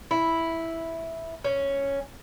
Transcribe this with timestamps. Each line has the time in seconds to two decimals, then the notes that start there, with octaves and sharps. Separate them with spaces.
0.11 E4
1.45 C#4